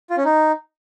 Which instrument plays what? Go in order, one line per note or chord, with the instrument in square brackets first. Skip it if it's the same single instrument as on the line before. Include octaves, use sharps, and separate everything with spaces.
[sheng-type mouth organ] F4
C#4
D#4